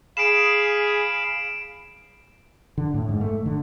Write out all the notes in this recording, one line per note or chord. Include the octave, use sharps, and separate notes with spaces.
G#4 F5 B5 D7 E7
D3
A2
G#2
A3
D3